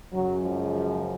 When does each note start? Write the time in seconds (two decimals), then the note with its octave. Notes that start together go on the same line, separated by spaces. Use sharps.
0.12 F#2 C#3 F#3
0.42 F3 G#3